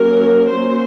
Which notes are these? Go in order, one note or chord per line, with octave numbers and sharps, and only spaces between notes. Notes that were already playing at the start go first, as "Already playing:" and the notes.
Already playing: F#3 A#3 C#4 A#4
F#3 A#3 C#4 C5